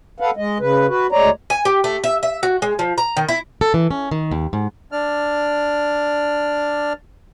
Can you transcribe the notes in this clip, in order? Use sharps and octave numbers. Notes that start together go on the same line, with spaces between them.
A4 B4 F5 F#5
G#3 D#5
C#3 B4
F#4 B4
D2 G#3 C#5 D5 A#5
G#5
G4
A3
E5
E5
F#4
G#3
F3
A#5
D#3
E4
A4
E3
C#4
D#3
D#2
G#2
D4 D5 F6